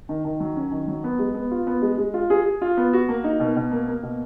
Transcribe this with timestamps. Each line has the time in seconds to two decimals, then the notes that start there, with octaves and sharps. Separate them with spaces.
0.09 D#3
0.25 D#3
0.40 F#3
0.56 C#4
0.71 D#3
0.87 F#3
1.04 B3
1.19 G#3
1.34 B3
1.51 F4
1.67 B3
1.82 G#3
1.98 G#3
2.14 F4
2.30 G#4
2.45 G#4
2.61 F4
2.77 B3
2.93 F#4
3.09 A#3
3.24 D#4
3.40 B2
3.56 B2
3.71 A#3
3.87 A#3
4.03 B2